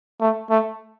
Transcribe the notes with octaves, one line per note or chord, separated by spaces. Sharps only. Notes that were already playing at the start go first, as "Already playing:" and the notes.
A3
A3